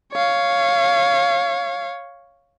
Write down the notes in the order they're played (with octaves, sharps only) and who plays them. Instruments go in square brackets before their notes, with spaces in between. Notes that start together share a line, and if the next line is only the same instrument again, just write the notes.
[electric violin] C#5 F5